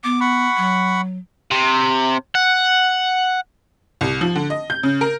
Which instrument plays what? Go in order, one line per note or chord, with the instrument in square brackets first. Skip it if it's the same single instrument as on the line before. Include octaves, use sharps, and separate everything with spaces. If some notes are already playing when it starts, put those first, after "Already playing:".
[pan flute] B3 [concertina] D6
[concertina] F#5 B5 C#6
[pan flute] F#3
[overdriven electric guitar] C3
F#5
[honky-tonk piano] C2
F3
D3
D#5
G6
C#3
A#4